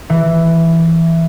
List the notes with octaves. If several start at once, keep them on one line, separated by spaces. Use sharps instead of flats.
E3